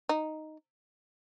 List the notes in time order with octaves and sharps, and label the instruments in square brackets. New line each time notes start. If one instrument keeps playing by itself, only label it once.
[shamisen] D#4